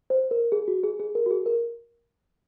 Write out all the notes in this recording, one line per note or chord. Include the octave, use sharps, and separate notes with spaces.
C5
A#4
G#4
F#4
G#4
G#4
A#4
F#4
G#4
A#4